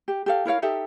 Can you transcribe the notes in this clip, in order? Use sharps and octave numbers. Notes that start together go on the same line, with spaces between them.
G4
G4 A4 F5
E4 A#4 C#5 F5
D#4 G4 A4 E5